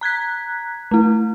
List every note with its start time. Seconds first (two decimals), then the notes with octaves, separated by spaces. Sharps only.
0.01 A#5 F#6 G#6 B6
0.91 A3 E4